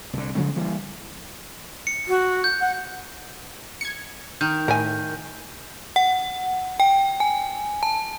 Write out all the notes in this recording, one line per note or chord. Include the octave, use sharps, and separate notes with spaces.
C2 D3
C#3 F3 G#3 C4
E3 G3 A#3
C#7
F#4
G6
F#5
G#6 C#7
D#3 G6
A2 A#4 G#5
F#5
G5
G#5
A5